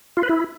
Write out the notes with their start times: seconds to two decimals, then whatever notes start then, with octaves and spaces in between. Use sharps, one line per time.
0.17 F4
0.23 B4
0.29 E4